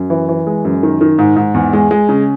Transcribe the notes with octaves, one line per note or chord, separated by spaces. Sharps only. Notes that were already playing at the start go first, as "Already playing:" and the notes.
Already playing: F#2
E3
E3
G#3
F#2
D#3
D#3
G#2
G#2
E2
G#3
G#3
C#3